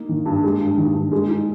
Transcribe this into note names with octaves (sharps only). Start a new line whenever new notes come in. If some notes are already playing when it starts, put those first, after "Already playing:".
Already playing: A#3 D#4
D#3
G2
G#3
G2
D#3
G2
G#3
D#4